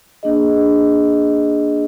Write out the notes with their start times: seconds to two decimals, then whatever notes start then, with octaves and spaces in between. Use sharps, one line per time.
0.23 A#3 D4 G#4 D#5